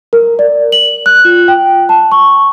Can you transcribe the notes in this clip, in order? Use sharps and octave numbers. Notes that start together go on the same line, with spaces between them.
A#4
D5
F#7
F#6
F4
G5
A5
C#6